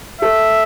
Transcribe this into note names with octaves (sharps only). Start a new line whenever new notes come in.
A4 E5